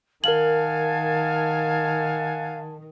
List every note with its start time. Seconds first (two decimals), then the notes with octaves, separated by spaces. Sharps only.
0.24 D#3 A#4 F5 F#5 G#5 A5 F#7